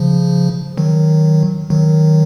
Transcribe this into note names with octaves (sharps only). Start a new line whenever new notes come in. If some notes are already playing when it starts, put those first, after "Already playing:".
Already playing: C#3 F3
D#3 F#3
D#3 F#3